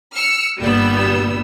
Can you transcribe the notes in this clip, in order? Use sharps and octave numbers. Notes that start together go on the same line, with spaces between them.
E6 F6 C#7
G1 A#2 G3 B3 E6